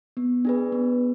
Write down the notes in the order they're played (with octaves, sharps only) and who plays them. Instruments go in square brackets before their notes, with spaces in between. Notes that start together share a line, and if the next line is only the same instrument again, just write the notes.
[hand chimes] B3
D4 G#4 B4
B3